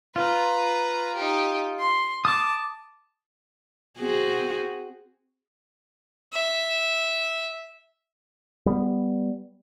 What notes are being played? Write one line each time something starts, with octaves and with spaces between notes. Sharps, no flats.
F4 B4 A#5
D#4 G4
C6
A5 D6 D#6
C4 F#4 G#4
E5
G3 B3